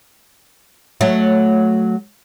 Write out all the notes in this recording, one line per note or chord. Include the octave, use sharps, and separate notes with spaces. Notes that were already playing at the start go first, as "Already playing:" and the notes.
F#3 A3